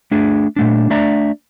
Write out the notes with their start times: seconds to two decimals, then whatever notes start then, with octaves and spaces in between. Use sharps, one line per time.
0.11 A3 D4 G#4
0.56 A#2 A3 D4
0.90 A3 D4 D5 E5 A#5